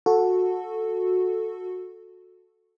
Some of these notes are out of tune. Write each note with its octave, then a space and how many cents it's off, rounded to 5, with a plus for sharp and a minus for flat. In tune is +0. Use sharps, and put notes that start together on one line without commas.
F#4 -15 A4 +0